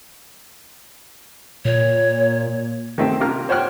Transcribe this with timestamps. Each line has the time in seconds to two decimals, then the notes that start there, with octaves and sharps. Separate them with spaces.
1.65 A#2 C#5
2.98 D#3 A3 C4
3.20 C3 F4 A#4 F6
3.49 C5 C#5 F#5 G5 F6 F#6